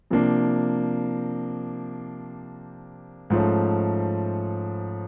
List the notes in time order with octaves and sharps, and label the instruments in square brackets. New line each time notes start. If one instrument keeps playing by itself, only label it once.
[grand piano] C3 F3 A#3 D4
G#2 F3 A3 C#4